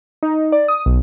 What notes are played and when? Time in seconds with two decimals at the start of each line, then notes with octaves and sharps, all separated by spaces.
0.23 D#4
0.52 D5
0.68 D#6
0.86 B1